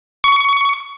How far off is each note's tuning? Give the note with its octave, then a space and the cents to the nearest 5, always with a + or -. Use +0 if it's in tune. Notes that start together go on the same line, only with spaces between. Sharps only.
C#6 +20